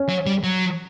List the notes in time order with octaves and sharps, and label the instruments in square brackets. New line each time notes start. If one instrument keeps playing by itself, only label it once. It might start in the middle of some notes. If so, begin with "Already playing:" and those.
Already playing: [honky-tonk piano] C#4
[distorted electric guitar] F#3
G3
F#3